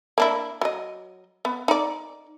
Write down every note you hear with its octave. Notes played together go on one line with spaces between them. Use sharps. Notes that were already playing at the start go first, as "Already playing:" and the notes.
A#3 D4 E4
F#3 D#5
B3
D#4 D5